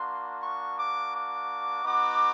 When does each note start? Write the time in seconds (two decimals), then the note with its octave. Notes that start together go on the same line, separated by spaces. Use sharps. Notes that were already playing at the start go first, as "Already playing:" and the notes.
Already playing: A#3 D4 F#4 C6
0.43 C#6
0.78 D6
1.14 D6
1.84 B3 D#4 F#4 D6